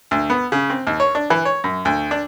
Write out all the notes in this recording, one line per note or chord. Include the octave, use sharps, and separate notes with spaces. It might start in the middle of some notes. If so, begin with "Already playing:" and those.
D2
B3
C#3
C4
D#2
C#5
D4
E3
C#5
F#2
D2
D4